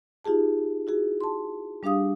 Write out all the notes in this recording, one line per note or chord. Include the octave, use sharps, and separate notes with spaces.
D#4 F4 G4 G#4 A5
E4 F#4 G#4
A5 C6
G3 D4 G4 F5 D#6